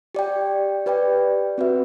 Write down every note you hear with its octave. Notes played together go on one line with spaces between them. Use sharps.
G4 D5 G5
G4 B4 D5 G5
C4 F#4 B4 E5